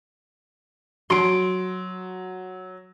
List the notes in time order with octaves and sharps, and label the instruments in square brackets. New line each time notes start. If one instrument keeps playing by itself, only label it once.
[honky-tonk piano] F#3 [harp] C6 D7